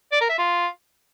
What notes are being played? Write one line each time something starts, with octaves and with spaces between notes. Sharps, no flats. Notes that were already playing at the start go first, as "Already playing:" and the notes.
D5
A#4
E5
F4